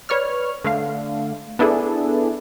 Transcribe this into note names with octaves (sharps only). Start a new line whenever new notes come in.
B4 C#5 D5 F6
D3 A3 F5
B3 D4 E4 G#4 A4